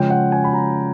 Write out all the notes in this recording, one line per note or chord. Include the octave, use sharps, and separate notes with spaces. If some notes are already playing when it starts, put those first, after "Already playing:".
Already playing: C#3 F3 G#3 C#4 G5
F#5
G#5
B5
A#5